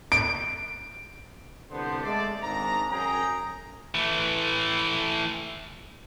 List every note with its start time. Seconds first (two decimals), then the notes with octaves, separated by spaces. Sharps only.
0.12 D7
1.71 C2 D3 B3 C5
2.03 G#3 A3 A4 D5
2.42 G#1 G#2 D4 A#5
2.89 F#2 G#4 G5 A#5
3.95 E3 A3